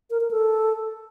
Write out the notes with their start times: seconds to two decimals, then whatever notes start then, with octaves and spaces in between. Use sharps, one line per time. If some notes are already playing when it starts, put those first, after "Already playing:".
0.10 A#4
0.21 A#4
0.31 A4